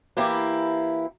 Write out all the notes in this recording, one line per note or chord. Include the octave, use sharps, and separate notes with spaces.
E3 A#3 E4 G4